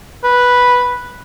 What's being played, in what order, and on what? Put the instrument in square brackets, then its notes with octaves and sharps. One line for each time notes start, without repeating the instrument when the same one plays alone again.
[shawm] B4